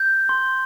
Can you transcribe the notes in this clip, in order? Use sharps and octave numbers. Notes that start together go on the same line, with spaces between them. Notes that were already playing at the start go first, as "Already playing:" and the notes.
Already playing: G6
C6